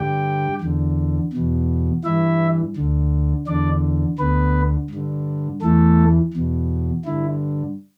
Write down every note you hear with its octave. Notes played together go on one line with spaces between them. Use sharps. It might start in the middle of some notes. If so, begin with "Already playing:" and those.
Already playing: G2 D3 G4 G5
E2 D3
E2 B2
G2 E3 E4 E5
D2 D3
E2 D3 D4 D5
D2 D3 B3 B4
G2 D3
E2 E3 A3 A4
E2 B2
G2 D3 E4